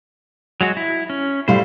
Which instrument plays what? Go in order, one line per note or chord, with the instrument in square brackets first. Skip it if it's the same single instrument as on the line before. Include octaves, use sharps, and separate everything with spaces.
[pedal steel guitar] F#3 G#3 F#4
E4
C#4
[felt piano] A2 G3 F5 [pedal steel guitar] C5